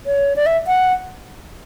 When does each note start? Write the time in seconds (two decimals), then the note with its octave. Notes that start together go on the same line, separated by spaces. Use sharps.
0.06 C#5
0.36 D5
0.46 E5
0.67 F#5